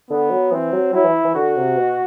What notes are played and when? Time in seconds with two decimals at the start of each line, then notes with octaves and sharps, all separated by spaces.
0.10 D3 B3
0.31 F#3
0.51 E3 C4
0.73 F#3
0.93 F#3 E4
1.04 E3
1.24 E3
1.35 D3 F#4
1.56 C3
1.77 B2